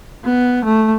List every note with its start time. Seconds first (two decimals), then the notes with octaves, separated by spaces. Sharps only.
0.25 B3
0.65 A3